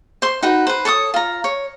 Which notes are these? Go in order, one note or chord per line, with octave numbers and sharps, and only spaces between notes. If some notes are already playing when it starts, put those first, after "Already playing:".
C5 C6
D#4 F#4 B4
B4 C5
A4 C#5 D6 D#6
F4 A#5
C#5